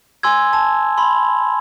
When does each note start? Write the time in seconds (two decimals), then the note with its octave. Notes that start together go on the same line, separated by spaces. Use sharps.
0.23 G#5 C6 E6 G#6
0.53 A5
0.98 B5 C6